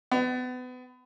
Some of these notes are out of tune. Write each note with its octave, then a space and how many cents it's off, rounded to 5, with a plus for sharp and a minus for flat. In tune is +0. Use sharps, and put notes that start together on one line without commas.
B3 +30